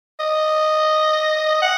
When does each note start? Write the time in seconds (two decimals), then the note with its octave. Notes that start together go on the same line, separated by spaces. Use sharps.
0.20 D#5
1.62 F#5